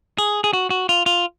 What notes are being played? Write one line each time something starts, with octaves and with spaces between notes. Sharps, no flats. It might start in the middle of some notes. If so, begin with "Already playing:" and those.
G#4
G#4
F#4
F#4
F4
F4